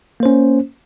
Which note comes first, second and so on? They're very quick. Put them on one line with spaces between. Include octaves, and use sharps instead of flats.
A#3 C5 C#4